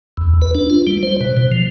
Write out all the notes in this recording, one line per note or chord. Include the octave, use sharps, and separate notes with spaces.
E2
B4
D4
F4
G3
C5
B2
B2
F3